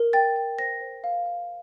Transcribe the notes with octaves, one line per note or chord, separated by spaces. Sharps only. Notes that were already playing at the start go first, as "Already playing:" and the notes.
Already playing: A#4
G5 A6
G5
C5 A#6
C5
F5
F5